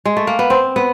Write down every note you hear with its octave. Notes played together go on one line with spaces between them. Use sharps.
G#3
A3
A#3
B3
C4
B3